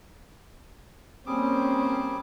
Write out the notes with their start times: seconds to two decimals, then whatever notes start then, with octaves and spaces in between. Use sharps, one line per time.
1.26 G3 A#3 C4 C#4 G#4 C5 D6